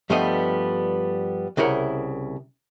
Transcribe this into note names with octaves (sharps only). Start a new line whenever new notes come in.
G2 F3 G3 A3 B3 D#5
C2 C#3 E4 A#4 F#5